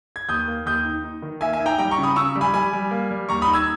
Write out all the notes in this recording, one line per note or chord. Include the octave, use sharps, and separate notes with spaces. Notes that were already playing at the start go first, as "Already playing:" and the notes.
G#6
D#2 D#6 G6
A#3
D#2 D#6 G6
D#4
D#4
D#3
A#3 E5 G#5
E5 G#5
D#4
G5 A#5
G3 G5 A#5
A#5 C#6
C#3
B5 D#6
C#3 C#6 E6
G3
G#5 B5
G3 G#5 B5
G3
A#3
G3
D#2 A#5 C#6
B5 D#6
D#4
E6 G#6